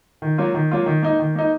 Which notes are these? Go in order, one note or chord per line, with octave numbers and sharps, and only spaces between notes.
D#3
F#3 A#3 F4
D#3
F#3 A#3 F4
D#3
A#3 D#4
D#3
A#3 D#4